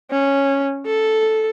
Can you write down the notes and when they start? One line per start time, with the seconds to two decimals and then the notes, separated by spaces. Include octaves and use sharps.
0.11 C#4
0.86 A4